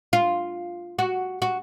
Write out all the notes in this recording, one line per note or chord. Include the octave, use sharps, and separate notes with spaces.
F4
F#4
F#4